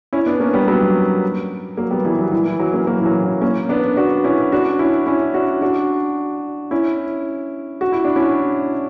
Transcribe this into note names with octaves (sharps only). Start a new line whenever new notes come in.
C#4 E4
B3 D4
A#3 C#4
G3 B3
F#3 A#3
F#3 A#3
G3 B3
E3 G3
F#3
E3
E3
F#3
A#3 C#4
F#3 A#3
E3
F#3
F#3
A#3 C#4
B3 D4
D4 F#4
C#4 E4
D4 F#4
C#4 E4
C#4 E4
D4 F#4
D4 F#4
C#4 E4
F#4
E4
D4
C#4 E4